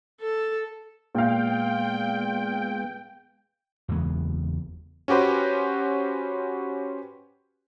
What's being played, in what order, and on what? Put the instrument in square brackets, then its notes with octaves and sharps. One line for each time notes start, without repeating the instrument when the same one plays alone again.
[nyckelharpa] A4
[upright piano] A#2 F5 [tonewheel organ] G#3 B3 [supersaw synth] G5
[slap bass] F#1 E2 G#3 B3
[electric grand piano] C#4 F#4 G4 B4 C5